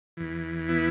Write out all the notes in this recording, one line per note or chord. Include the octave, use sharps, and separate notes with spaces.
E2 E3
B3 E4